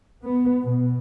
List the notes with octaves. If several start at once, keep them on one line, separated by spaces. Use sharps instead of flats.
B3
B2